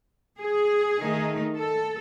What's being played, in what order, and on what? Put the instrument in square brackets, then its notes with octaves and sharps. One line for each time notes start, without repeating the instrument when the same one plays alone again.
[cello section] G#4
D#3 A3 D#4
A4